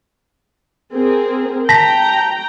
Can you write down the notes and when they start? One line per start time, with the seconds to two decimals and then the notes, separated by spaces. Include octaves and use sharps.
0.93 C4 G#4 A#4
1.69 G5 A5 A#5 A#6 B6